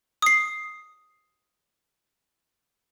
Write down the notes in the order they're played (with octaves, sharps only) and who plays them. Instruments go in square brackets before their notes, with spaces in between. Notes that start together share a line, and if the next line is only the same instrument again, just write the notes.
[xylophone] D#6 C7